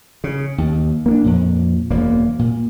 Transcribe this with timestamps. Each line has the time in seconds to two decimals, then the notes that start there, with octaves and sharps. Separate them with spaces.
0.24 C#3
0.58 D#2
1.06 A#3 C#4 D4
1.24 F2 A#2
1.90 E1 F#2 A#3
2.39 A#2